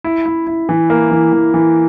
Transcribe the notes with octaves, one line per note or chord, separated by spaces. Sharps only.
E4
E4
E4
E3
A#3
E3
E3
E3